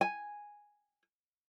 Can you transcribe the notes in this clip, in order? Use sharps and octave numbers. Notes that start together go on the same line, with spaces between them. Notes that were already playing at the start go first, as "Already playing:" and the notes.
G#5